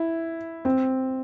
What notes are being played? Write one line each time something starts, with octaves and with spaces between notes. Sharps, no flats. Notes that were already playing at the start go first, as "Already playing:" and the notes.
Already playing: E4
C4